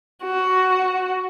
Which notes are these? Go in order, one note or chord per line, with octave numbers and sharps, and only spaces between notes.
F#4